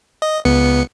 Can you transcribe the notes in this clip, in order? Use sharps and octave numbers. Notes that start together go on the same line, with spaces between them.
D#5
C#2 B3 C#7